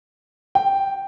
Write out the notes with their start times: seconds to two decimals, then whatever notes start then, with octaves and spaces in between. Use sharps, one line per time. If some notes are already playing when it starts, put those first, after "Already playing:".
0.55 G5